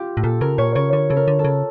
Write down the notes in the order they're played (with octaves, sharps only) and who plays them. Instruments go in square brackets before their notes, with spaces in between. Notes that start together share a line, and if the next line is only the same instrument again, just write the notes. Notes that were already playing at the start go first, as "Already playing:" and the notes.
Already playing: [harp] F4 G4
[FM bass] A2
[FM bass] A#2 [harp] A4
[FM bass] C#3 [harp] A#4
[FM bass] A#2 [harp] C#5
[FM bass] C#3 [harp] C#5
[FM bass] D3 [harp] C#5
[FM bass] C#3 [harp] A4
[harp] A#4
[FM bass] D3
[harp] A4
[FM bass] C#3